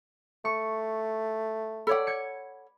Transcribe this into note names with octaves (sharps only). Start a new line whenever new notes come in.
A3 C#6
A4 C#5 D5 F#5 B5
G#6 C#7